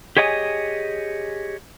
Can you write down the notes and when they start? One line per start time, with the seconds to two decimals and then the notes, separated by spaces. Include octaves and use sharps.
0.17 G4 G#4 C#5 D#5 F#5 G#5